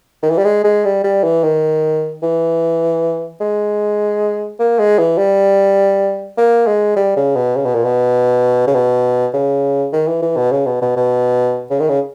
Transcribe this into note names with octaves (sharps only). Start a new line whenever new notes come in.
D#3
E3
G3
G#3
G#3
G3
G3
E3
D#3
E3
G#3
A#3
G#3
E3
G3
A#3
G#3
G3
C#3
B2
C#3
B2
A#2
B2
C#3
B2
C#3
D#3
E3
E3
B2
C#3
B2
B2
B2
C#3
D#3
C#3